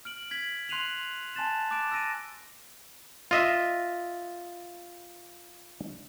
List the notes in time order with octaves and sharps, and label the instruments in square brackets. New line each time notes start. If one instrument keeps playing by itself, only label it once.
[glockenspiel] F6 D7 F#7
G#6 B6 F#7
C6 F#6 C7 D#7 F7 F#7
G#5 A5 C6 F#6 A6 E7
D6 F#6 A6 D7 E7
E6 A6 A#6 D7 D#7
[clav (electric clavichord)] F4 D#5 E5